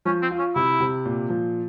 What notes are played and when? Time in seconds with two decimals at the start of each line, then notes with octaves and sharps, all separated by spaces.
0.05 F3 C#4
0.22 C4
0.31 F4
0.39 C#4
0.55 C3 E4
0.80 C3
1.05 A#2
1.30 F3